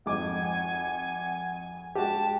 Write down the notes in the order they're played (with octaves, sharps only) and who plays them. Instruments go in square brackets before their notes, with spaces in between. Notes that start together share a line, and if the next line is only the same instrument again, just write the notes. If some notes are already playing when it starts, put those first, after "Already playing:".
[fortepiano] G#1 F2 D6 [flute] F#5 [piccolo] G#5
[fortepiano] G#3 F#4 G4 [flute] G5 [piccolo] A5